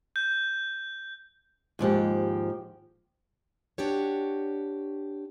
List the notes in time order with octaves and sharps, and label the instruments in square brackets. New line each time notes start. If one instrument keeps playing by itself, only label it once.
[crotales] G6
[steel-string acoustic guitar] D#2 G#2 F3 G4
D4 F#4 G4 C#5